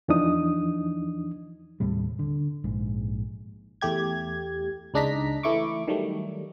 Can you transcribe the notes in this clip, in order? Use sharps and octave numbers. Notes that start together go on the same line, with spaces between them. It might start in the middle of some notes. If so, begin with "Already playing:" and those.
E2 E3 F3 D4 D#4 D#6
D#2 A2 C3 G3
D3
A#1 G#2
E2 A3 G4 G#6
C#2 G#3 D4 D#4 A#5 B6
E3 A3 E4 C#6 D6
D#3 F#3 G3 A3